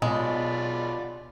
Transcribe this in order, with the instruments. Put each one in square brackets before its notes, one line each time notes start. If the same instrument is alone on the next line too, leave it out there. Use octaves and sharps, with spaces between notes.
[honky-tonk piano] B1 [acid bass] B2 [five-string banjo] G#3 [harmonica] F4 D5 B5